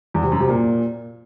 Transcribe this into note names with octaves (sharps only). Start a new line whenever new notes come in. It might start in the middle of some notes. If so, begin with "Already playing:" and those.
E2
C3
F#2
C3
A#2